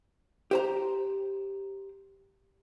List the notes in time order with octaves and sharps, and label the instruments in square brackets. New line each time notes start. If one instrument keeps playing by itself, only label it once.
[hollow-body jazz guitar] G4 C5 A#5